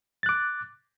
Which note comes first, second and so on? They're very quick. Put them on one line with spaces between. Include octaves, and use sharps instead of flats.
A6 F#6 D6